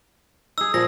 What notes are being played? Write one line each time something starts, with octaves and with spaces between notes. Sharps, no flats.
D#4 G#4 E6
A#2 F3 G#4 A#6